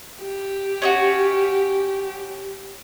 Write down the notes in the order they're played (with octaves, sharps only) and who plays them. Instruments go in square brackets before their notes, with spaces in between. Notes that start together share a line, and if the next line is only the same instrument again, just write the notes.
[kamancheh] G4
[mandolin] C#4 D#4 F#4